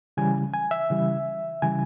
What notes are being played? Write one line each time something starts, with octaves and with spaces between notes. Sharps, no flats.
C#3 E3 G3 G#5
G#5
E5
C#3 E3 G3
C#3 E3 G3 G#5